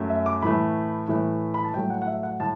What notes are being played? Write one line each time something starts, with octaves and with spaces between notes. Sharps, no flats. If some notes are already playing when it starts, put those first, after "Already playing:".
Already playing: F#2 F#3 A3
E5
D6
A2 E3 A3 B5
A2 E3 A3
B5
A5
A2 F#3 A3 G5
F#5
F#5
E5
F#5
A2 A5